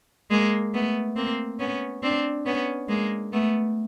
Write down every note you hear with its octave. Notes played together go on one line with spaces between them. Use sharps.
G#3 A#3
A3 B3
A#3 C4
B3 C#4
C4 D4
B3 C#4
G#3 A#3
A3 B3